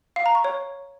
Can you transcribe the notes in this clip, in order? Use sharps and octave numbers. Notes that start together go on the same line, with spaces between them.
F5
A#5
C#6
C#5